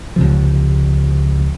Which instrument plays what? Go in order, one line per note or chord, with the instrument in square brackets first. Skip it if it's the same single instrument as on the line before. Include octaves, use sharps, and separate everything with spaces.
[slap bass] C#2 C3 F3